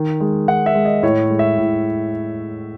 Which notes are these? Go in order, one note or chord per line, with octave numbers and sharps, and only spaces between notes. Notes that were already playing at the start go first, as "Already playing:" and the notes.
Already playing: D#3
G#3
D#3 F#5
E5
G#3
D#5
A2 C#5
G#3
E5
A2